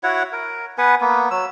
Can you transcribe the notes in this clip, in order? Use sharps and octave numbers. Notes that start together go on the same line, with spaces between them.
E4 F#4 C#5 F#5
A#4
B3 B4 F#5 G#5
A#3 B3
F#3 E6